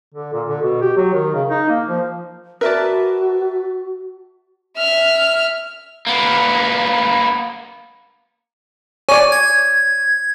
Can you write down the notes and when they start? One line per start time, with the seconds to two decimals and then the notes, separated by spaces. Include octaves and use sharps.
0.15 D3
0.33 A#2
0.48 D3
0.62 B2
0.82 G4
0.97 F#3
1.14 D#3
1.34 C#3
1.50 D#4
1.69 A#3
1.89 F3
2.61 F#4 A#4 B4 D5 E5 A5
4.77 E5 F6
6.07 A#3 B3
9.09 C#5 D5 G#5
9.32 G#6